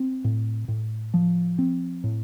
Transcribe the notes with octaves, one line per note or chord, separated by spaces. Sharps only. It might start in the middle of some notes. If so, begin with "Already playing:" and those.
Already playing: C4
A2
A2
F3
C4
A2